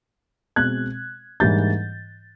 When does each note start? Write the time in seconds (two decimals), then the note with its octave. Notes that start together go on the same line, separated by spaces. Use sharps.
0.56 B2 G#3 C4 F#6 G#6
1.40 G#2 E3 G3 A#3 D4 G6 A6